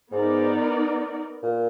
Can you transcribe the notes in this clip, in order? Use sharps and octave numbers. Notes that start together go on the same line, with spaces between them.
G#2 B3 D#4 A#4 D5
A#2